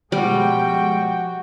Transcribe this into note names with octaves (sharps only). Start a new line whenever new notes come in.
B2 F3 G3 G#3 F#4 G5